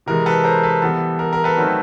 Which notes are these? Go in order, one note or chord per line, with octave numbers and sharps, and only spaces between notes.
C3 E3 G#3 A#4
A4 B4
A#4 C5
A4 B4
E3 G3 B3 A4
A#4
A#4
A4 B4
D#3 F#3 A3 C4